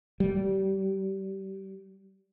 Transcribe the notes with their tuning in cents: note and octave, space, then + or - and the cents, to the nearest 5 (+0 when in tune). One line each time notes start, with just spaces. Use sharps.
G3 -25